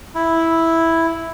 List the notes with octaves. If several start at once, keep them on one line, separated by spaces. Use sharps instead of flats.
E4